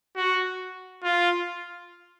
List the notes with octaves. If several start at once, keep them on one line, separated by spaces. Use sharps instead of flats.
F#4
F4